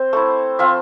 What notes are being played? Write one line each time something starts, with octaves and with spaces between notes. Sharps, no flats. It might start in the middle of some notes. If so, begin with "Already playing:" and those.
Already playing: C4 C5
A3 E4
F3 C4 F4 E5